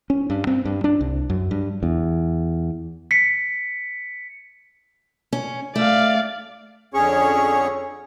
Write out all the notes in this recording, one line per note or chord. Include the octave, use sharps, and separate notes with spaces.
C#4
G2
C4
G2
D4
C2
F#2
G2
E2
B6 C#7
C#4
A3 D5 F5
F2 D3 C#4 G#4 C#5 C#6